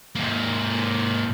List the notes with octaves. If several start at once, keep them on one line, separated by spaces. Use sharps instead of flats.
G#2 A#3